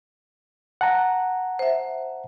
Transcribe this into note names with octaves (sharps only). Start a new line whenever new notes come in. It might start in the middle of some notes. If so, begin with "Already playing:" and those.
F#5 A5 A#5
C5 E5